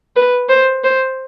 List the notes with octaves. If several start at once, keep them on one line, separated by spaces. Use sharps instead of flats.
B4
C5
C5